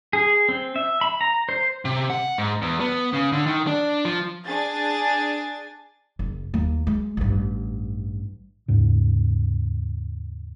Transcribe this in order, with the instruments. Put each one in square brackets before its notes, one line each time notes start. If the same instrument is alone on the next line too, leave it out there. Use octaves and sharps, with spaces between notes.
[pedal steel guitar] G#4
C4
E5
B5
A#5
C5
[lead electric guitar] C3
F#5
G#2
E2
B3
C#3
D3
D#3
D4
F3
[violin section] D4 G#4 G#5 A6
[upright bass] F#1
D#2 A#3
G#3
A1 G2
[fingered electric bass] D#2 G#2 C#3